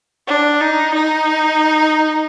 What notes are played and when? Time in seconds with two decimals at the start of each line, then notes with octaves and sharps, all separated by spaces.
0.27 D4
0.61 D#4
0.95 D#4